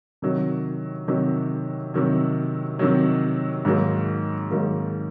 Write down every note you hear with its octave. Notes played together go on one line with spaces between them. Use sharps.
C3 D#3 F#3
C3 D#3 F#3
C3 D#3 F#3
C3 D#3 F#3
G#2 D#3 F#3 A#3
G#2 D#3 F#3 A#3